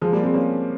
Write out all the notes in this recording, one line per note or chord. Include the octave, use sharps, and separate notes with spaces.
F3 G#3
G3 A#3
G#3 C4
A#3 C#4